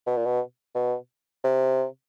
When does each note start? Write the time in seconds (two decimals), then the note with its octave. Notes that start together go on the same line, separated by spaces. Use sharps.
0.07 B2
0.17 A#2
0.25 B2
0.75 B2
1.44 C3